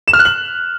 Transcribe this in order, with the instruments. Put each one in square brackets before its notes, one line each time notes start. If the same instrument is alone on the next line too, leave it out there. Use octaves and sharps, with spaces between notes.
[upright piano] E7
F6
F#6
F#7